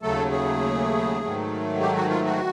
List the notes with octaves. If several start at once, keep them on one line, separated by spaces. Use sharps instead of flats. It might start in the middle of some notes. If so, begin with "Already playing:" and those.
D#2 C#3 F#3 A3 A4
G#4
G#2 D#3 F#3 A3
G4
F#4
F4
F#4